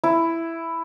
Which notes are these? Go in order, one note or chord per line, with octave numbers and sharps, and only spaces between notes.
E4